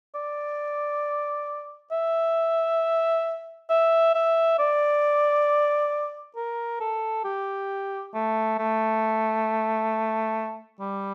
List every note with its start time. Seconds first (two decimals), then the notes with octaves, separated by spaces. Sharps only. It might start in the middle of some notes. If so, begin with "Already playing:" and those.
0.15 D5
1.92 E5
3.70 E5
4.15 E5
4.59 D5
6.36 A#4
6.81 A4
7.25 G4
8.14 A3
8.59 A3
10.80 G3